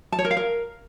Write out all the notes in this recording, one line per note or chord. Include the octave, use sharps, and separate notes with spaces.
A5
C#5
A#4
F5
A#4